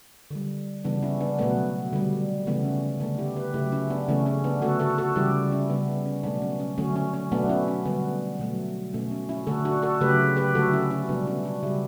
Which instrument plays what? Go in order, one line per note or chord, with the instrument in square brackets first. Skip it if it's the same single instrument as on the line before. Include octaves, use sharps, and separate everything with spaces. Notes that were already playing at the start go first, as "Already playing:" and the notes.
[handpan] D3 G3
C#3 E3 G3 B3 D4
C#4 E4
B3 D4
B2 F#3 A3 B3
D3 G3
C#3 E3 A3 B3
C#4
C#4
D3 A3 B3 D4
E4 G4
G4 B4
C#3 F#3 A3 E4 G4
C#4 E4
B3 D4
C#3 E3 A3 C#4
C#4
B3 D4
D3 A3 F#4 A4
F#4 A4
F#4 A4
C#3 E3 G3 E4 G4
C#4 E4
C#3 G3 B3 D4
B3
C#4
B2 F#3 A3 B3 D4
C#4
C#4
D3 F#3 A3 C#4
C#4
C#4
B2 F#3 A3 B3 D4
C#4 E4
C#4
D3 G3 B3
B2 F#3 A3
B2 A3 C#4
C#4
C#4 E4
D3 A3 F#4 A4
D4 F#4
F#4 A4
C#3 F#3 A3 G4 B4
G4 B4
D3 F#3 A3 F#4 A4
C#4 E4
C#4 E4
B2 G3 B3 D4
C#4 E4
D4 F#4
C#3 G3 E4 G4